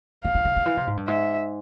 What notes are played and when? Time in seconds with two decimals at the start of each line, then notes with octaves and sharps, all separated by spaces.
0.24 D#3 F5
0.34 D#3
0.45 D#3
0.56 D#3
0.66 E3
0.77 C3
0.87 G#2
0.97 G2
1.08 G#2 E5